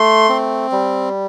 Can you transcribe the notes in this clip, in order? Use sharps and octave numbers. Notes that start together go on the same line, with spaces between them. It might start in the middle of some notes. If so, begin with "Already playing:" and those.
Already playing: A3 C6
C4
G3